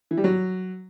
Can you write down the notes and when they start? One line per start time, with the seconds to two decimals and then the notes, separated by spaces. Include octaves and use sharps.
0.11 E3
0.17 G3
0.24 F#3